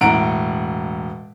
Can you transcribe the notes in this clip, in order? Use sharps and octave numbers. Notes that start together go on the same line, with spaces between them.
E1 A2 F#5 A#5 D7